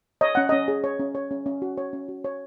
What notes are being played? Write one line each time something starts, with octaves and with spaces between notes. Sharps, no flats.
C#5 D#5
C#4 F#5
C#4 D#5
G#4
C#5
C#4
C#5
C#4
C#4
F#4
C#5
C#4
F#4
C#5